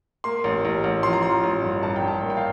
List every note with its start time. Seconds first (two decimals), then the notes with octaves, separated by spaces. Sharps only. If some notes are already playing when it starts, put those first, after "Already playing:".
0.24 A#3 C6
0.44 A1
0.65 A1
0.84 A1
1.03 F3 C6
1.13 A#5
1.23 F3 C6
1.43 A1
1.62 G2
1.83 G2 A5
1.96 G5
2.02 G2
2.08 A5
2.21 A#3 A5
2.30 G5
2.37 F5